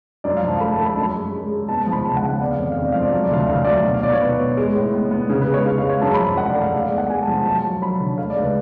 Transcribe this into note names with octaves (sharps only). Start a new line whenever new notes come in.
F#2 D5
F5
F3
A5
A3 B5
A5
A3
B5
F#2 A5
B5
G#3
G#3
G#3
B3 A5
A5
F3
B5
C#2 A5
F#5
C#3
F#5
B3 D5
F5
F2 D5
F2 F5
D5
F3 F5
D5
F#3 F5
D5
D2 F5
D5
D2 F5
F#3 D5
B2
F5
B2 D5
C#5
B2 B4
B2
G#3
A2
B3
B3
C#3
B4
G#3
C#5
C#3 F5
F5
G#3
C#5
F#2 A5
B5
F3
F#2 F#5
D5
A3
F5
G#3 D5
D5
B3
F#5
G#3 G#5
A5
F3
A5
F#3 A5
F#3
F#3 B5
D3
A3 F5
D5
C#2
B4